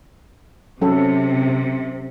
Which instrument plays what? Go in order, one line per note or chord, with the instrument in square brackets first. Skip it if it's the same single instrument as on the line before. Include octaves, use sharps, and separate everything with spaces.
[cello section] C3 [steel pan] F#3 C#4 A4